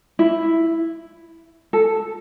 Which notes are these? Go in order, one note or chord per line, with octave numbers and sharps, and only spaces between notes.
E4
A4